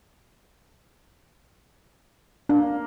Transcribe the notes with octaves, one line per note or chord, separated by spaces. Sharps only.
A#3 D4